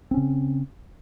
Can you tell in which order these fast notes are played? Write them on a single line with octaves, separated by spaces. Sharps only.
C4 C#4 C#3